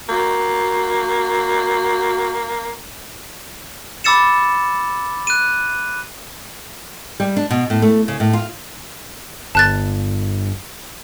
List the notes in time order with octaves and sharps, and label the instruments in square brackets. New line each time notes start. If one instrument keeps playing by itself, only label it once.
[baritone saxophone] A#3 [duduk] F#4
[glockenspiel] B5 D6 E6 A6 C#7 E7
F#6 D#7
[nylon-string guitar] G3
D4
B2
A2
A3
C#3
A2
F4
[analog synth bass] G1 [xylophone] A5 F#6 A6